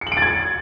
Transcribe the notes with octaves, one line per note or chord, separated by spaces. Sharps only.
C#7
F#7
D7
A6
G#6